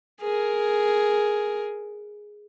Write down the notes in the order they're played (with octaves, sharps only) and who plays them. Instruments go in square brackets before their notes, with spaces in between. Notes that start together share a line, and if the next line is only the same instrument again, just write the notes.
[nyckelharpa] G#4 A#4